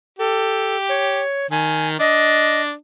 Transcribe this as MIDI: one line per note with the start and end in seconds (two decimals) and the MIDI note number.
0.19 1.20 67
0.19 0.76 69
0.89 1.47 73
1.51 1.96 51
1.51 1.88 80
1.99 2.73 62
1.99 2.61 75